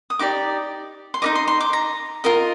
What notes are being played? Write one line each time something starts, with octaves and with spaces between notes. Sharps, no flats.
D#6
D#4 G4 D5 D6
C6
D#4 A#4 D#5 D6
C6
C6
D6
A#5
F4 A#4 D#5